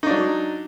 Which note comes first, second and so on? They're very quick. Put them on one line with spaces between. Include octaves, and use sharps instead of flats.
D#4 D4 F#3